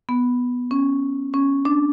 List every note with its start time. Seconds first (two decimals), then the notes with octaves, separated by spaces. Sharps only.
0.09 B3
0.71 C#4
1.34 C#4
1.65 D4